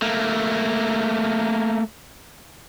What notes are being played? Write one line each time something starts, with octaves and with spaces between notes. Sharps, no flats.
A3 A#3